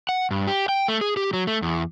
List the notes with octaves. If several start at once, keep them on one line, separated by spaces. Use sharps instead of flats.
F#5
G2
G4
G5
A3
G#4
G4
F#3
A3
E2